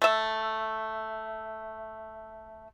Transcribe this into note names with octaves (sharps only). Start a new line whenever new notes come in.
A3 E5